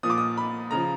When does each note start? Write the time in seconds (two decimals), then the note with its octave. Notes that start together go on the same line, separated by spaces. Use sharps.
0.03 A#2 F3 D#6
0.10 D6
0.18 D#6
0.37 B5
0.71 C#3 F3 A#5